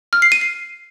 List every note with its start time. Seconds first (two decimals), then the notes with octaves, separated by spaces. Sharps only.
0.13 F6
0.22 C7
0.32 D#7
0.41 C7